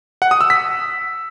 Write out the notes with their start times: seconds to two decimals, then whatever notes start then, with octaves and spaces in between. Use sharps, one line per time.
0.22 F#5
0.31 D#6
0.41 E6
0.50 B6